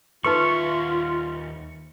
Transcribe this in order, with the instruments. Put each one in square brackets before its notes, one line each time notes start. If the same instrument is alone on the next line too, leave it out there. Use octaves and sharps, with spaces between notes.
[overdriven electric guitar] D#2 E5 [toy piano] D#4 B4 C6 [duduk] F4 [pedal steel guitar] C#6